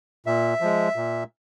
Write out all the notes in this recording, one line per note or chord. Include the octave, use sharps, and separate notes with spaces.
A#2 E5
F3 G#3
A#2